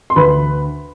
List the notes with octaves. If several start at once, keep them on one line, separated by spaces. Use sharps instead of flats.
C6
D2 B4 B5